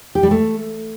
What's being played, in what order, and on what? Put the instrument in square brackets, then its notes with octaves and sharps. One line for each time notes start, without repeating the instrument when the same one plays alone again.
[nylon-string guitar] G4
G3
A3